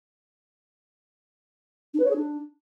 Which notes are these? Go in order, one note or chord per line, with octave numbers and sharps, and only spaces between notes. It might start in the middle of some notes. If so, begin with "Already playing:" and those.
D4
B4
C#5
G#4
D4